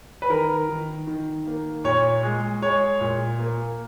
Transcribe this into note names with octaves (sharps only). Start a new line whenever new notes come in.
B4
D#3 A#4
D#3
D#3
A#3
A#2 C#5
G#3
G#3 C#5
A#2
A#3